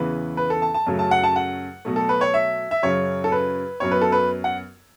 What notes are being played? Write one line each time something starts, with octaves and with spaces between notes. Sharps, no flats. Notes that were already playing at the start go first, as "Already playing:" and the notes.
Already playing: E2 C#3 E3 B3 B4
B4
A4
A5
A5
F#2 C#3 F#3 A3
A5
F#5
A5
F#5
B2 F#3 A3
A4
B4
C#5
E5
E5
F#2 C#3 F#3 C#5
A4
B4
F#2 F#3 B3 C#5
B4
A4
B4
F#5